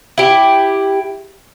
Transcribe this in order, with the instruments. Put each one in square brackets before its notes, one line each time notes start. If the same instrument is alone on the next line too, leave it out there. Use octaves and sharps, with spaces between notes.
[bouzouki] E4 G4